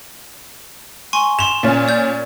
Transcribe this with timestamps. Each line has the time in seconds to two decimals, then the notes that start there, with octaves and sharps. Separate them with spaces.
1.13 G#5 C6 C#6
1.39 C6 E7 F7
1.63 A#2 C#4
1.88 D5 G6